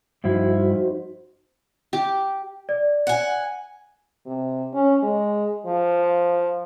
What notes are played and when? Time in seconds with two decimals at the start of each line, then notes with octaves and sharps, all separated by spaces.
0.24 G2 F3 D#4 E4 F#4 C5
1.93 G4
2.69 D5
3.07 F#5 G#5
4.26 C3
4.74 C#4
5.03 G#3
5.67 F3